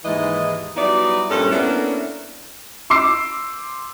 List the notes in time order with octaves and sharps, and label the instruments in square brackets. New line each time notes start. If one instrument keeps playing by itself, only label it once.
[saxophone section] D#2 G#2 E3 G#3 E4 D#5
F#3 G3 B3 D#4 E4 D5
G2 A#2 G#3 C#4 A4
A#3 B3 C#4 D4 E4 A4
[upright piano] C6 D6 E6 C7